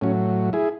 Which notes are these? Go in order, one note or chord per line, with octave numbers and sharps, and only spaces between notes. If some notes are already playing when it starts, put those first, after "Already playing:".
A2 F#3 C#4
E4 G#4